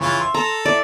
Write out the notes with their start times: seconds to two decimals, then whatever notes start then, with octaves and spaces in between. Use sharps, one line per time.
0.01 C#3 E3 F4 C#6
0.20 E5 C6
0.34 A4 A#5
0.65 E4 D5